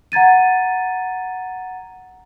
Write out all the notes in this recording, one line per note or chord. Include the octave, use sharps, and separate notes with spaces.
F#5 A#5 G#6 A6 D#7